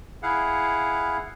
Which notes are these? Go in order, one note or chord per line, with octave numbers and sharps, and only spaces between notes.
E4 G#4 F5 F#5